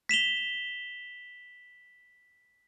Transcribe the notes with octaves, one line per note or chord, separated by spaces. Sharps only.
B6 E7 F7 G7